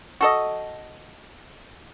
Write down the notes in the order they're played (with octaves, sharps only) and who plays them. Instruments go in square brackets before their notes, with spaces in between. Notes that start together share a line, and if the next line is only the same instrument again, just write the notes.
[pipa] F#4 A4 D#5